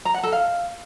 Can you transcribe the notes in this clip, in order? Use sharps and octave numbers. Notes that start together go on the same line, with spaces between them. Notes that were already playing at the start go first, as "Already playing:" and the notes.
A#5
F#5
A4
F5